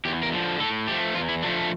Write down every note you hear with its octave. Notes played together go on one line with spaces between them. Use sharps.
E2 G4
A#4
D3 F3
A2 A4
F3 A3 G4
E2 F4
E4
D3 F3 A3 D4